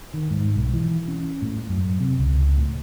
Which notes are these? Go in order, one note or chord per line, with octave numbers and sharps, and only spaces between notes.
D#3
G#2
B1
E3
C#4
A2
F#2
C3
C#2
A2